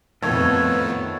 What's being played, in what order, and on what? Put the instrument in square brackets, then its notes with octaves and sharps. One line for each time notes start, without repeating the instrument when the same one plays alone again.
[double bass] F2 B3 [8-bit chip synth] A2 D#3 F3 [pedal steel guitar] A4 C#5